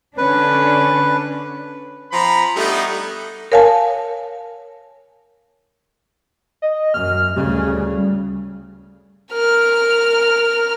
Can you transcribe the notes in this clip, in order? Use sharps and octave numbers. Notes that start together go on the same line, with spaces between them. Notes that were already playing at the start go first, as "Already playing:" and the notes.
D3 C#4 D4 B4
F3 C4 A#5 B5
G3 A3 B3 D4 D#4
A#4 C#5 F5 G#5 A5
D#5
F#2 F6
D2 C#3 G3
A#4 F6